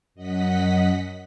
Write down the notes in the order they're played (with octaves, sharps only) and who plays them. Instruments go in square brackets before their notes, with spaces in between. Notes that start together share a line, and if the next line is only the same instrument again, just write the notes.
[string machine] F#2 D#5 F#5 B6